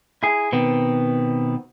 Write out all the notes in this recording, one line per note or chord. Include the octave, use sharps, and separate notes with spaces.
E4 G#4
B2 D#3 B3 C4